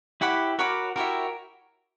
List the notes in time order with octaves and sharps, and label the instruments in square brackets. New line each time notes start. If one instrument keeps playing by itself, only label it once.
[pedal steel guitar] E4 G4 [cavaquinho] C#5 F#5 B5 D6
[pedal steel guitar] F#4 A#4 [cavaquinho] C#5 F#5 B5 D6
[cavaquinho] E4 G4 C#5 E5 [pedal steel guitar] F#4 A#4